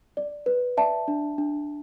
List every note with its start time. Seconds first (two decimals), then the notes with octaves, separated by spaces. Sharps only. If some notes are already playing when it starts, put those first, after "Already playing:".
0.17 D5
0.46 B4
0.77 D5 E5 A5
1.08 D4
1.38 D4